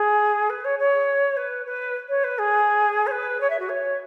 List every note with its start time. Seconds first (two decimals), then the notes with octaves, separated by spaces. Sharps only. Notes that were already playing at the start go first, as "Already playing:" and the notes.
Already playing: G#4
0.49 B4
0.64 C#5
0.79 C#5
1.37 B4
1.66 B4
2.09 C#5
2.24 B4
2.38 G#4
3.07 C#5
3.11 B4
3.40 C#5
3.50 E5
3.59 F#4
3.69 C#5